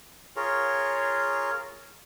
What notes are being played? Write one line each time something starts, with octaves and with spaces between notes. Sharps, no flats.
F4 G#4 A#4 C#5